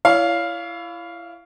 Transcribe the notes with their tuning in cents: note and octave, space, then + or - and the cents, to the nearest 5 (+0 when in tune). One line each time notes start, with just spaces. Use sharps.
E4 +25 C#5 +35 F5 +0